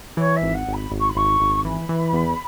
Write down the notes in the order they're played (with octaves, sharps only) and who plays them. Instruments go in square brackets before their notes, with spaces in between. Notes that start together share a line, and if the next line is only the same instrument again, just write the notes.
[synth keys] E3 [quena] C#5
[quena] E5
[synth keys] G#1
[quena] F#5
[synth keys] G#1
[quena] B5
[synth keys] G#1
[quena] C#6
B5
[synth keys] G#1 [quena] C#6
[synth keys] G#1
[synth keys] E3 [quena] B5
[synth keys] E3
E2